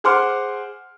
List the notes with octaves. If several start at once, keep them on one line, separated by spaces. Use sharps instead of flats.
G#4 C5 F#5 C6 D6 F6